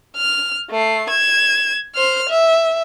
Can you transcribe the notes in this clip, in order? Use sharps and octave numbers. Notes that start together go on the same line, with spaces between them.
F6
A3 C7
G#6 E7
C5 F6
E5